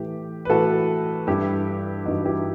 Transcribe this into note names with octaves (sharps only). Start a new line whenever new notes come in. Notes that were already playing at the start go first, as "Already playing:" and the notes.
Already playing: A2 E3 G4
B4
A2 E3 F#4 A4
G2 E3 E4 G4
G2 E3 D#4 F#4
E4 G4